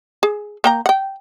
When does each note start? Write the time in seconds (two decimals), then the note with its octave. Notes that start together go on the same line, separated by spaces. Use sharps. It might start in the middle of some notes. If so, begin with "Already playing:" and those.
0.23 G#4
0.64 A#3 G5 A#5
0.86 F#5 G5